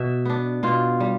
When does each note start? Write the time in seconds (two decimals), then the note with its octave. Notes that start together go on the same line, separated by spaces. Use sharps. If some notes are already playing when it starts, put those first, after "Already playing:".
Already playing: B2 E5
0.25 B3 D4
0.63 B2 F4
1.00 G3